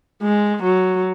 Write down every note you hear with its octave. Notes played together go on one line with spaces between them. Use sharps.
G#3
F#3